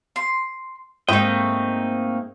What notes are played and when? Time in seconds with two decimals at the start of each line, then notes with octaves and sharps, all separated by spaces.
0.16 C6
1.09 G#2 A3 A#3 C4 D#4 D#5 G5